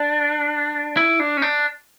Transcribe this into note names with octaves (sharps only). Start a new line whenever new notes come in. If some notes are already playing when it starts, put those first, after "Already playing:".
Already playing: D4
E4
D4
C#4
D4